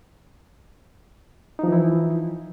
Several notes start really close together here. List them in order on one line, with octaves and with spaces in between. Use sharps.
D#4 F3 E3 E4